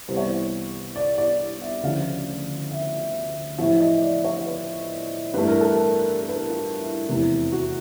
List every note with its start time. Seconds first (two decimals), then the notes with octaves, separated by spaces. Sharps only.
0.08 C2 C3 E3 G3 B3 C5
0.17 C#5
0.24 C5
0.96 D5
1.18 D5
1.61 E5
1.83 D2 C#3 F3 F5
2.71 E5
3.58 A1 A2 F3 E5
3.81 D#5
4.02 D5
4.24 C#5
4.46 B4
5.34 G2 E3 A3 B4
5.47 A#4
5.61 A4
5.75 A#4
6.21 A#4
6.28 B4
6.36 A#4
6.50 F4
6.79 E4
7.09 F1 E2 C3 E3
7.52 F#4